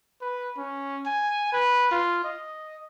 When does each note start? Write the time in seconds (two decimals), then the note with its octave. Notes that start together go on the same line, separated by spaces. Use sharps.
0.21 B4
0.57 C#4
1.06 G#5
1.53 B4
1.91 F4
2.24 D#5